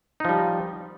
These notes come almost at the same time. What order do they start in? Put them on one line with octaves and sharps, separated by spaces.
D#4 F3 G3